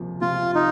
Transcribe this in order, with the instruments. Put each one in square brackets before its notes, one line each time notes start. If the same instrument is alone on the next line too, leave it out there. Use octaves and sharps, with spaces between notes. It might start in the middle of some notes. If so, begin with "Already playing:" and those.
Already playing: [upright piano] C#2 C3 F3 A#3
[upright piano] C3 [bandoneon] F4
[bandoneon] D#4